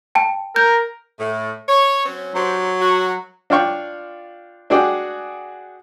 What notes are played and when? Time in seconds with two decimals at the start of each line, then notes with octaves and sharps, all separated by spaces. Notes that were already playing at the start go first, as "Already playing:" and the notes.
0.15 G5 A5
0.56 A#4 G6
1.19 A2
1.68 C#5
2.06 F#3 C4 C#4
2.35 F#3 D4 G4 C5
2.80 F#4
3.50 D4 F4 D5 F5 G5 C#6
4.70 D4 F#4 G#4 D5 G5